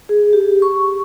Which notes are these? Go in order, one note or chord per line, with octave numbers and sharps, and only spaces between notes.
G#4
G4
C#6